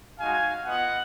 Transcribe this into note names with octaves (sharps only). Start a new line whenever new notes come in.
G#3 D#4 F#4 F5 G#5
B3 F4 D#5 F#5